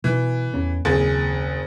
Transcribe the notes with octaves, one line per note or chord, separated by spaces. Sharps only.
B2 E3
E2 B3 C#4
F#1 D#2 C4 G#4 A6